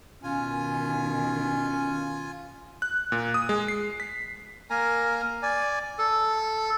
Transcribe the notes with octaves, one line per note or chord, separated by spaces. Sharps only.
B2 D#3 C#4 F4 G#5
F#6
A#2
D#6
G#3
C7
B6
A#3 A#4 G#5 A#5
D5 G#5
A4